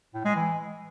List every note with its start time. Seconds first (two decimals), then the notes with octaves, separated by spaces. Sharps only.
0.14 A2
0.25 G#3
0.36 E3